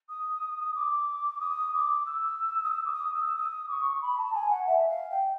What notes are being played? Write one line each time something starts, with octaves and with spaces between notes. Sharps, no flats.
D#6
D6
D#6
D6
E6
D#6
E6
D6
D#6
E6
D#6
D6
C#6
B5
A5
G#5
F#5
E5
F5
G5